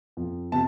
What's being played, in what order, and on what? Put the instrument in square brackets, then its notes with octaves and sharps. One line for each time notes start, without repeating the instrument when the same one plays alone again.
[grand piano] F2
C3 A5